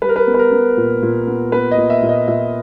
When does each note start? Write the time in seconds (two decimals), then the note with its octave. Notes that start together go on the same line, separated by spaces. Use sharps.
0.02 G3 B4
0.09 A#4
0.16 B4
0.27 B3
0.34 B4
0.39 A#4
0.52 B3
0.77 A#2
1.02 A#2
1.27 B3
1.52 B3 B4
1.71 D#5
1.78 A#2
1.90 E5
2.03 A#2
2.09 D#5
2.28 A#2 E5